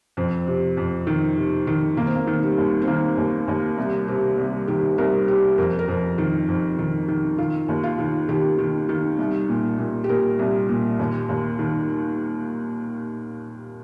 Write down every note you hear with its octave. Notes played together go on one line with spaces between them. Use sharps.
F2 C4
C3
F2
D#3
C3
D#3
D#3 A#3
C4
A#3
D#3
G3
D#2
C4
D#3 A#3
D#2
D#2
C2
C3
C2
D#3 G4
C2 A#4
C3 G4
F2 A#4
A#4
F2
D#3
F2
D#3
D#3
D#3 F4
D#2
F4
D#3
D#3 G4
D#3
D#3
C2
A#2
A#2
G4
A#2 A#4
C2
A#2
D#2
D#2
D#3